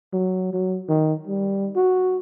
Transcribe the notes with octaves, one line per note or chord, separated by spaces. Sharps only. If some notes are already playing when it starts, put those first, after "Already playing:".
F#3
F#3
D#3
G3
F#4